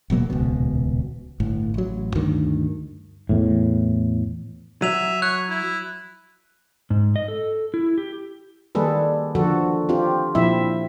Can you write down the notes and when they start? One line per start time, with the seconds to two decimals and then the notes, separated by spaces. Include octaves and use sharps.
0.10 D#1 B2 F#3 A#3
0.30 D#1 C#2 B2
1.40 G1 A2
1.74 A1 F#3
2.15 D2 G2 D#3
3.29 E2 A2
4.82 F#3 E5 D#7 F7
5.22 C#5 F#6
5.49 E4
6.90 G#2
7.16 D#5
7.28 A4
7.74 E4
7.98 G4
8.75 D#3 G3 A#3 G#4 A4 B4
9.35 D3 F3 F#4 A4
9.89 C4 F4 G4
10.35 A#2 F3 C4 E4 E5